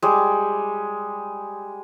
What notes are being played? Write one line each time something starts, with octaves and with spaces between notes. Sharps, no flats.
G3 G#3